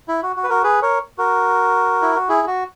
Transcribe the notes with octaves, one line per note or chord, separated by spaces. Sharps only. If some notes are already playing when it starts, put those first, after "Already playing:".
E4
F#4
F#4
B4
F#4 A#4
G#4 B4
A#4 C#5
F#4 A#4
E4
F#4
E4 G#4
F#4